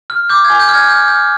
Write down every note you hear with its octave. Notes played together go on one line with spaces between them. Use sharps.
F6
D6 G6
G#6
G#5
G6
F6 G#6
F6 G6
F6 G6